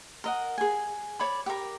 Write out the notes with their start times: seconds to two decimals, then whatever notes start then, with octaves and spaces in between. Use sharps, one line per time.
0.24 A#4 D#5 F#5
0.58 G#4 G#5
1.19 C#5 D5 B5
1.46 G4 A#4